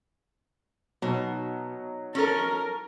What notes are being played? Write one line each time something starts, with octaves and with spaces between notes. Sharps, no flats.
B2 F#3 D#4
C#4 A4 A#4